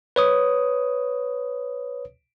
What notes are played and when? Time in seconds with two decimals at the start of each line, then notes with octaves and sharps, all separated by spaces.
0.16 B4 C#5 D#6